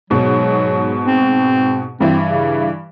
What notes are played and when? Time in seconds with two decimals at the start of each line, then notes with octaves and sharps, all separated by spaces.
0.10 G#2 B2 F#3
1.07 C4
2.01 G2 E3 C4
2.29 C#3